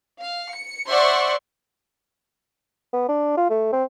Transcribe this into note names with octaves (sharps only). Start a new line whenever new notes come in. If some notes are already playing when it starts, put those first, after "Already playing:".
F5
C#7
C5 D5 E5 F#5 C6 C#6
B3
D4
F4
A3
C4